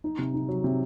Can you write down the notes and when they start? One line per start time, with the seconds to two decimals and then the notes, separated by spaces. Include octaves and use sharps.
0.04 D#4
0.19 C3
0.34 D#4
0.48 F#3
0.64 C3